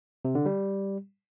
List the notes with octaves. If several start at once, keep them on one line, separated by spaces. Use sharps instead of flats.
C3
D3
G3